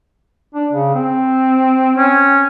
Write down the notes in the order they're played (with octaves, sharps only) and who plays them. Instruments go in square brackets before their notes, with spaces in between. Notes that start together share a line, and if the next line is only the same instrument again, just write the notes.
[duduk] D4
C#3
C4
[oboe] C#4